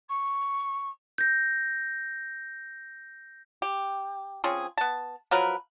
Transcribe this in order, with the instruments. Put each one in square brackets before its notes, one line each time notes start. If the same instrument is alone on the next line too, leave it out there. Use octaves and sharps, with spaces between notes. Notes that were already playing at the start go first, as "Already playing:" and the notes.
[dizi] C#6
[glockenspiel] G6 A#6
[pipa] G4
F3 C4 C#4 G#4
B3 A5
F3 F#3 A#4 B4